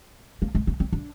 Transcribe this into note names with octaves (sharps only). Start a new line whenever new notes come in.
A#3
G#3
A#3
C4
D4